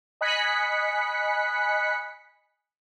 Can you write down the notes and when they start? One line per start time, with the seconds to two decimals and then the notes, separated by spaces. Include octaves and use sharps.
0.21 D#5 G#5 B5 F#6 B6 C#7